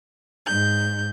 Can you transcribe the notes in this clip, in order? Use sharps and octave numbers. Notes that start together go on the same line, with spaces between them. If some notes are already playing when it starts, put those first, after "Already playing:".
G#2 G6